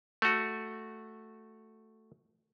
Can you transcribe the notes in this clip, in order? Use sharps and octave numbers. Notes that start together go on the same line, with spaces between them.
A3 F#4